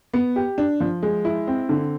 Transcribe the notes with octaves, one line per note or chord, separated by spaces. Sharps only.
B3
G4
D4
F3
G#3
E4
C4
D3